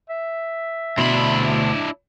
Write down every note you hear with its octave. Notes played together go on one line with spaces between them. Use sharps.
E5
D2 B2 D4 E4 B5 C6